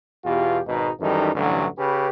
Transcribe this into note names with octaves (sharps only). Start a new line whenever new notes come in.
E2 B2 F4 G4
G#1 B2 D#4
F#2 D#3 E3 G3 D#4 A4
A1 D2 G2 D3 E3 F#3
C#3 C#4 G4 B4